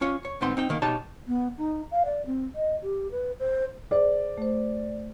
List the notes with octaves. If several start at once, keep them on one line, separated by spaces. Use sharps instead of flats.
C#4 F4 C#5
C#5
D2 G#2 B3 C4 D#4 C6
C4 D#4 G5
D2 D#3 A#3
B2 D#4 G4 C#5 A5
B3
D#4
F5
D5
C4
D#5
G4
B4
C5
G#4 C5 D5
A3 C5